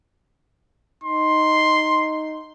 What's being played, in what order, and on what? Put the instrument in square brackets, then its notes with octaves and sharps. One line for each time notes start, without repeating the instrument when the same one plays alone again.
[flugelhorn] D#4 [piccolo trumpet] C6